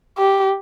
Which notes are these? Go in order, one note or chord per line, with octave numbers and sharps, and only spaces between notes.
G4